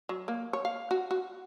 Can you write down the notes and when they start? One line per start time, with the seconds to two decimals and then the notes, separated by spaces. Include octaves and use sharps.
0.09 F#3
0.28 A#3
0.53 C#5
0.65 F5
0.91 F#4
1.11 F#4